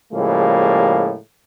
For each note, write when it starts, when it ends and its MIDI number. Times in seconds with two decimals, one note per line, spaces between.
0.13 1.15 45
0.13 1.15 49
0.13 1.15 53
0.13 1.15 55
0.13 1.15 56
0.13 1.15 58